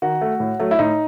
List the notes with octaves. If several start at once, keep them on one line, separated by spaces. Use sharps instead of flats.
D#3 F#4
A3
A2
F#3 A3
E4
A2 D#4